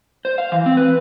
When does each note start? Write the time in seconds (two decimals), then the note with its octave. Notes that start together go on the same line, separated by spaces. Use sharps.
0.25 C5
0.38 F5
0.52 E3
0.66 C4
0.77 B4